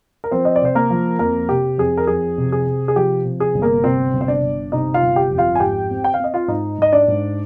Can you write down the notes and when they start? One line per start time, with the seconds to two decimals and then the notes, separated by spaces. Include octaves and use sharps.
0.24 A#4
0.31 F3 C4 C5
0.45 D#5
0.56 D5
0.62 C3 C5
0.75 A#3 A#4
0.90 F3
1.19 F2 A#3 A#4
1.49 C3 G4
1.78 F2 G#4
1.97 A#4
2.07 F2 G#4
2.38 C3
2.52 G#4
2.66 C3
2.88 G#4
2.96 F3 G4
3.25 C3
3.40 G#4
3.54 G1
3.62 A#3 A#4
3.84 C3 C4 C5
4.13 G1
4.21 C5
4.28 D4 D5
4.42 G1
4.72 C3 D#4 D#5
4.94 F4 F5
5.02 G1
5.16 G4 G5
5.30 F2
5.38 F4 F5
5.55 G#5
5.60 G#2 G4 G5
5.90 C4
6.04 G5
6.14 F5
6.19 C4 D#5
6.34 F4 F5
6.48 G#2 D#4 D#5
6.78 G#2 D#5
6.92 D4 D5
7.08 G#2